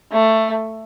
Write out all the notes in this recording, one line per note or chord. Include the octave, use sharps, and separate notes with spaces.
A3